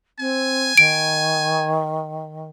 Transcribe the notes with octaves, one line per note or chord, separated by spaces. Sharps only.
C4 G#5
D#3 D7